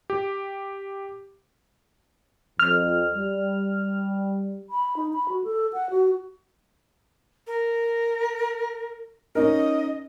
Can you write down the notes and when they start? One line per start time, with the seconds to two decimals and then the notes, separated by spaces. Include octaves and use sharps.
0.10 G4
2.59 F2 F6
3.15 G3
4.69 B5
4.96 D#4
5.13 B5
5.29 F#4
5.44 A4
5.73 F#5
5.90 F#4
7.47 A#4
9.35 C#4 D#4 A#4 D#5